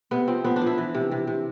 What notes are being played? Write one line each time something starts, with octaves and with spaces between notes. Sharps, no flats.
C3 B3
F3 C4
F3 B3
D4
F3
E4
E3
C3
C3
C3